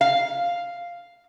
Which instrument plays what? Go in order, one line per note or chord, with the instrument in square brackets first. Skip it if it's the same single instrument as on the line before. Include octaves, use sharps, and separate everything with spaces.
[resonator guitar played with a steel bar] F5